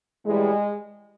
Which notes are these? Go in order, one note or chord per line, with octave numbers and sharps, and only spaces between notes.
A2 E3 G3 G#3